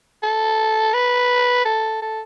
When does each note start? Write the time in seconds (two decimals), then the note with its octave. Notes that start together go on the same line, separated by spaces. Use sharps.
0.22 A4
0.93 B4
1.65 A4
2.02 A4